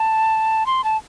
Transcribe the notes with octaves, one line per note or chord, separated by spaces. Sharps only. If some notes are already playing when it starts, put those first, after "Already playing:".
Already playing: A5
C6
A5